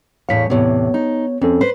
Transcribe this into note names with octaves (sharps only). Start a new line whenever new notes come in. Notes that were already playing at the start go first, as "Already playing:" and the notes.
E2 A2 C#5 F5 B6
E2 A2 C3 B3 C#5
D#4
F2 C4 C#4 A4
B4 C5